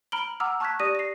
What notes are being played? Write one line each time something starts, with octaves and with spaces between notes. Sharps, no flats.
A#5 B5 F6 D7 F#7 G7
F#5 A#5 D6 E6 F6
A5 C#6 F6 F#6 G#6 B6
G4 D5 D#6 A#6 D#7
A#6 C7